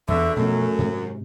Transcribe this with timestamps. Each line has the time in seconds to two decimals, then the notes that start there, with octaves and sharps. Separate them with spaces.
0.08 E2 B2 D3 E5
0.36 F#2 B2 F3 A3 C#4
0.79 G#2 C3